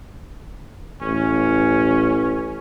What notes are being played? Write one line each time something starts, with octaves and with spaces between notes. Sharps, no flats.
A1 C#4